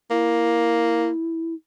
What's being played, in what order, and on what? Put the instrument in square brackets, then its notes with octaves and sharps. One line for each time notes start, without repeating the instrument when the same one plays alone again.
[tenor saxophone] A#3 [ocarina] E4